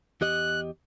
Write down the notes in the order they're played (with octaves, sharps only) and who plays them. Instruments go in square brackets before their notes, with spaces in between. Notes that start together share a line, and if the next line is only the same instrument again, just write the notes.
[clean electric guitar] E2 G4 D#5 [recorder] F#6